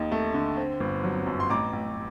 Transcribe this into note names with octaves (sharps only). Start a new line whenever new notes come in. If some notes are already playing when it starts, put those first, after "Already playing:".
Already playing: D#2 D#4
A3
D3
C4
G1
F#3
F#2
C6
A1 A#5 D6
A1